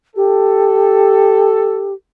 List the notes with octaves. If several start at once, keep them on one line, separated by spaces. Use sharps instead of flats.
G4 A4